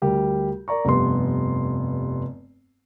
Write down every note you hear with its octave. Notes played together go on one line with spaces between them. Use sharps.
D2 G3 G4 A#4
A#4 D5 A#5 C#6
F1 G2 B3 C6